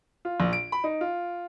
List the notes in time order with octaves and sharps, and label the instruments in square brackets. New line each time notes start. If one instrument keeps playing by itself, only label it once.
[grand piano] F4
A#1
D7
B5
D#4
F4